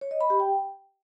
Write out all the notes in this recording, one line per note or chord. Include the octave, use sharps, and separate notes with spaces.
C#5
D#5
B5
G4
G5